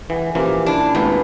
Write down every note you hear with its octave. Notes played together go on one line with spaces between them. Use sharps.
E3 G4 G#4 F#5
A#2 C#3 E3 F3 A#3 F4 G4
D4 E4
G#1 D#2 A2 A3 B3 G#4